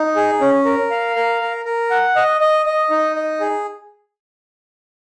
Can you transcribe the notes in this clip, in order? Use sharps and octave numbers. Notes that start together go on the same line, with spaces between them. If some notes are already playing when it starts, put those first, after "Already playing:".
Already playing: D#4
G#4
C#4
A#4
F5
A#4
A#4
A#4
F#5
D#5
D#5
D#5
D#4
D#5
G#4